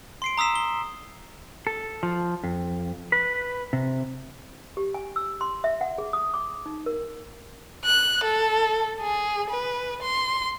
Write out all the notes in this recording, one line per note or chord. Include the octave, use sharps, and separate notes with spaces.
C6 C7 D7
A#5 D#6 E6 B6 E7
G7
A4
F3
F2
B4
C3
G4
G#5
E6
C6
E5
F#5
G#4
D#6
D6
D#4
A#4
F#6
A4
G#4
B4
C6